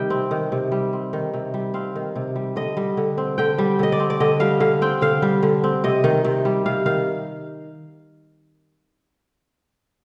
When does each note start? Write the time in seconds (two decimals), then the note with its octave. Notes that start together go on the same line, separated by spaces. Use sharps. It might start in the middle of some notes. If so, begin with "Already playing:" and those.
Already playing: C3 D#3 G3 D#5 G5
0.10 C4
0.31 D#3
0.52 C3
0.72 G3
0.93 C4
1.13 D#3
1.34 C3
1.54 G3
1.74 C4 F5
1.96 D#3
2.16 C3
2.36 G3
2.56 D3 D#5
2.77 G3
2.97 D3
3.18 C4
3.38 D3 G5
3.58 G3
3.79 D3 D#5
3.92 D5
4.00 C4
4.10 D5
4.20 D3 D#5
4.40 G3 F5
4.60 D3 F5
4.82 C4 G5
5.01 D3 F5
5.22 G3
5.43 D3
5.64 C4
5.84 C3 D#5
6.04 D#3
6.24 C3
6.45 G3
6.66 C3 F5
6.86 D#3 F5